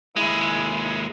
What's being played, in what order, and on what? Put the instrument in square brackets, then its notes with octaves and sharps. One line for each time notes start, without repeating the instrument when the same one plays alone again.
[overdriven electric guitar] D#2 G#3 [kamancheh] E4